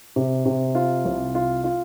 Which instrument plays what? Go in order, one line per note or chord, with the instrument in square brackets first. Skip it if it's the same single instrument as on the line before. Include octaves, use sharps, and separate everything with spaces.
[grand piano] C3
C3
F4
C2
F4
F4